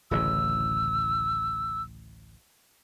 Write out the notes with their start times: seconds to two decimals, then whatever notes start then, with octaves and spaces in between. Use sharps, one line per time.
0.11 D1 A1 C#3 E6